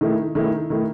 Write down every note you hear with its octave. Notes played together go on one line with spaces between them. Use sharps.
D#3 A3 E4
D#3 A3 E4
D#3 A3 E4